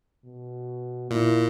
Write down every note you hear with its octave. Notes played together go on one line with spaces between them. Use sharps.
B2
A#2 E4